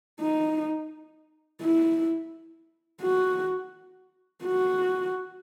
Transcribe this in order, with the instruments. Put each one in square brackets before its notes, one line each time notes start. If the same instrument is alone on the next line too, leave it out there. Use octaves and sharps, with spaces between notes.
[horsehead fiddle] D#4
E4
F#4
F#4